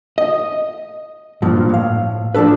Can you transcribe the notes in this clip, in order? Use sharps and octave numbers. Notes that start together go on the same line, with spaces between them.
D#5
G2 A#2 F3
A2 F5
F3 A3 D4 A4 B4